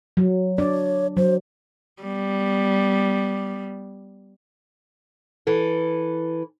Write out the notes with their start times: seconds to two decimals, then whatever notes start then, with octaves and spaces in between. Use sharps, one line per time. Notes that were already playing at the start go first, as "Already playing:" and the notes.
0.17 F#3
0.58 D4 C#5 D5
1.17 F#3 C5
2.03 G3 B3
5.47 E3 A4